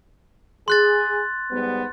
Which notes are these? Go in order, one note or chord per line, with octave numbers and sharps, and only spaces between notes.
G#4 C6 F#6 A6
G#2 G3 B3